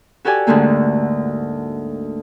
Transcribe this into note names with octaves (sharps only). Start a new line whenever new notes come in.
F#4 G4 A4 D5 G#5
D2 G#2 D3 A3 A#3